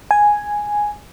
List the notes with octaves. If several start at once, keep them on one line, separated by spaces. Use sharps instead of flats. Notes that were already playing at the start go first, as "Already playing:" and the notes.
G#5